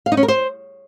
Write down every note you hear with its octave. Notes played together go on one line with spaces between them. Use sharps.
F5
D#4
C#4
A#4
C5